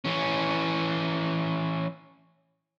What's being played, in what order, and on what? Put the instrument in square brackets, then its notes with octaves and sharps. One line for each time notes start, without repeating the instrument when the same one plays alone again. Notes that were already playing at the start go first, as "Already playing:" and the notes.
[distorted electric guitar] E3 C#4